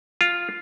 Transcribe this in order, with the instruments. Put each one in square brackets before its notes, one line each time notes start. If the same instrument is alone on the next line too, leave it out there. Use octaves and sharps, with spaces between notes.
[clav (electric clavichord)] F4